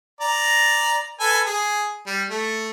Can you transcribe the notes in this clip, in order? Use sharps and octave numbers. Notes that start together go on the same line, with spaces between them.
D5 A#5
A4 B4 G#5
G#4
G3
A3